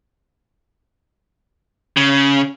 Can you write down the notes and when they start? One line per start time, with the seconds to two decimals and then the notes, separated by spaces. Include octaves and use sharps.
1.97 C#3